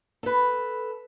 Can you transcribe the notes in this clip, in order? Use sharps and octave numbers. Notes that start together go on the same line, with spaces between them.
A4 B4